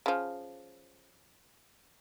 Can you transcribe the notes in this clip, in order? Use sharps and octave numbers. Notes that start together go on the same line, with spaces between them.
C#3 F3